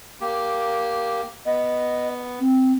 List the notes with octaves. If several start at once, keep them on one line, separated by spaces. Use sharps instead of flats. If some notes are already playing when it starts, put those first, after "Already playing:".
A#3 G4
B3 D#5
C4